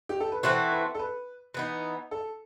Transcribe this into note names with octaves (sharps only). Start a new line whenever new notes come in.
G4
A4
B4
E3 A3 C4 F#4 C5
B4
A4
B4
E3 B3 D#4
A4